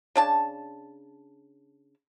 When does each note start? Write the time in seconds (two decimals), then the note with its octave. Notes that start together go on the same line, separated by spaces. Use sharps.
0.15 C#3 D4 A5